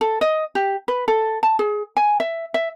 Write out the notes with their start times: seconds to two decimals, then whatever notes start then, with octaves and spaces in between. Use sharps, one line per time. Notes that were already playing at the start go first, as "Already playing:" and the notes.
0.01 A4
0.21 D#5
0.55 G4
0.88 B4
1.08 A4
1.43 A5
1.59 G#4
1.97 G#5
2.20 E5
2.54 E5